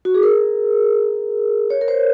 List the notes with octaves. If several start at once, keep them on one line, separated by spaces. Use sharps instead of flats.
F#4
G#4
A#4
C#5
A#4
C5